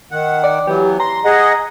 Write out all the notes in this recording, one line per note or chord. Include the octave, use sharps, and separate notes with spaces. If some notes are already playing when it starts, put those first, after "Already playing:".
D#3 F#5
D5
E3 F#3 B3 G4
A#5 C6
G#4 D#5 F#5